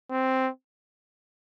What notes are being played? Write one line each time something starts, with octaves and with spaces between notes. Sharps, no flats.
C4